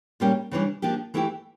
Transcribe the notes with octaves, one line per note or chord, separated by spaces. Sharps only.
A#2 G3 A#3 C#4 G4
C#3 E3 G3 D4
F3 A#3 D4 G4
E3 A3 E4 G4